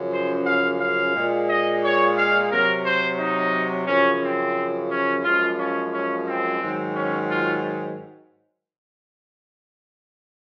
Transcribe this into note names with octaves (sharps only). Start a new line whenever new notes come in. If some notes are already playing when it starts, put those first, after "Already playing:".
Already playing: F#2 C#3 F3
C5
F5
F5
A#2 G#3
D#5
C#5
F5
C3 F#3 A#4
C5
D#4
F#2 C#3 F3 C#4
C4
C#4
F#2 F3 G#3 F4
C#4
C#4
C4
G#2 D#3 F#3
C#4
F4